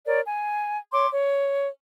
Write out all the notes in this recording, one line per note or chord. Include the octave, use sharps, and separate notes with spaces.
A#4 C#5 D5
G#5
C#5 C6 D6
C#5